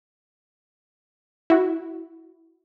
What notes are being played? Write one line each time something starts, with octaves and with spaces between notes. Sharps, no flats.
E4 F#4